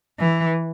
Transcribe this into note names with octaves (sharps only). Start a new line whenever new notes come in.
E3